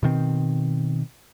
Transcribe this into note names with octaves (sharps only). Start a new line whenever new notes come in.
B2 D#3 C4